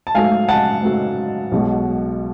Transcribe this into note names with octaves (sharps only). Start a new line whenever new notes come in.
A5
G#2 F#3 A3 F5 G#5
F#5 A5
G#2 F#3 A3
B1 B2 G#3